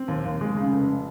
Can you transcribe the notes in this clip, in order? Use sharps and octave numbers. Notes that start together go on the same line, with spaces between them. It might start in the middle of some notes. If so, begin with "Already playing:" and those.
Already playing: C4
D#2
D#2
G#3
C#3
F1